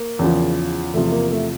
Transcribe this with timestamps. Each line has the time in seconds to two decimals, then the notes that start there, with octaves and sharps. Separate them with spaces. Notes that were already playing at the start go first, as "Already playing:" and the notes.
Already playing: A#3
0.19 E2 C#3 F3
0.94 E2 C3 F3 A3
1.12 A#3
1.31 A3